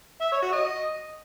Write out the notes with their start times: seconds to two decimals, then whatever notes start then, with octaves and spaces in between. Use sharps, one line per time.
0.22 E5
0.32 C#5
0.42 F#4
0.53 D#5